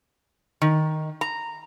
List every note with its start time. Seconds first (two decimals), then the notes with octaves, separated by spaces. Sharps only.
0.62 D#3
1.21 A#5